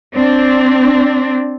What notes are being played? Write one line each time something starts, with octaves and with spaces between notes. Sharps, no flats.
C4 D4